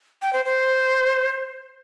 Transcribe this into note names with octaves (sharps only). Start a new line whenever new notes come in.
G5
C5
C5